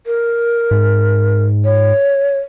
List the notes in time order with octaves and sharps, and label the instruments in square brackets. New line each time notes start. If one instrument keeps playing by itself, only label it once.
[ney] A#4
[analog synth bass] G#2
[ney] C#5